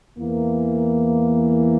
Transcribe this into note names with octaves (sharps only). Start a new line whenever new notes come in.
E2 E3 A#3